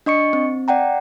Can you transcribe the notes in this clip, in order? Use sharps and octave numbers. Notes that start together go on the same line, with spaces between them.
D4 D#5 C#6 C#7
C4
D5 F#5 G5 A#5